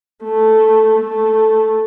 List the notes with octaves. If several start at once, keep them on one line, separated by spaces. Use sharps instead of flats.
A3
A3